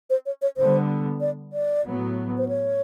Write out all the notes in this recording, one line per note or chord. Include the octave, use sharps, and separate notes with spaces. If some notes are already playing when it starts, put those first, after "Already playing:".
C5
C#5
C#5
D3 G3 B3 C5
D5
D5
A2 F#3 B3
C5
C#5